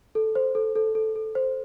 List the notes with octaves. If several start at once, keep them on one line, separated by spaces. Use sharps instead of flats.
A4
C5
A4
A4
A4
A4
C5